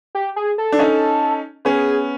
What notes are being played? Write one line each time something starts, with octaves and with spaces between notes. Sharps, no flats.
G4
G#4
A4
D4
C#4 D#4
B3 C#4 G#4